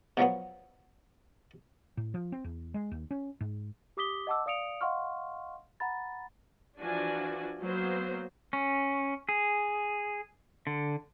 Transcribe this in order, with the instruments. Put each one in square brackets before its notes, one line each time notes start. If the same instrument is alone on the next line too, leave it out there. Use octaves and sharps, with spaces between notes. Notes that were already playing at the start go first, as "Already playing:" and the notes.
[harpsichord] B2 F3 F#3 B3
[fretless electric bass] A2
F3
C4
E2
G#3
D#2
C#4
G#2
[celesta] G4 D6 D#6 B6 G7
D#5 F#5 A5 D6 E6
D5 F5 D#6 C#7 D7 F7
D#5 F5 F#5 C6 C#6 F6
F#5 A#5 B5 A6
[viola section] E3 F3 D4 F#4 D5 G#5
F#3 A#3 B3 C5
[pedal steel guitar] C#4
G#4
D3